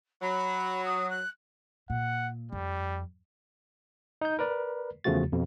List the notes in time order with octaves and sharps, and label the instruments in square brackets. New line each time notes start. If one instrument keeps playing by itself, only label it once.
[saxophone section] F#3 [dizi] B5
[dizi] D#6
F#6
[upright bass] A#2 [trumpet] F#5
[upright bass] F2 [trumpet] G3
[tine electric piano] D#4 G6
A#4 B4 D5
E2 C#3 F3 A3 F#4 A6
F2 B2